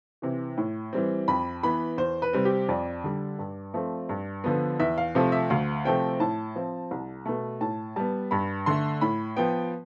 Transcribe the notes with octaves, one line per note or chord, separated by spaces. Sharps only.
C3 E3
A2
E3 G3 C4
F2 B5
E3 B3 B5
E2 C5
B4
C3 G3 C4
G4
F2 D5
D3 G3
G2
F3 A3 C4
G2
D3 F3 B3
E2 E5
F5
C3 F3 A3
E5
D2 F5
C3 F3 A3 C4 G5
A2 A5
F3 C4
C2
B2 A3
A2 A5
G3 B3 A5
G2 B5
D3 A3 C6
A2 B5
F3 B3 G5